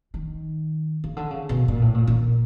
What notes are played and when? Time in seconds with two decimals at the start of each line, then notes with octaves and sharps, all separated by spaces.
0.14 D#3
1.04 C#3
1.17 D3
1.31 C#3
1.49 B2
1.68 A#2
1.82 A2
1.94 A#2
2.07 A#2